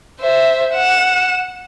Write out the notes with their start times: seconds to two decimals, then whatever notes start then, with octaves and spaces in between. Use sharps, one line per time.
0.20 C5 E5
0.74 F#5 E7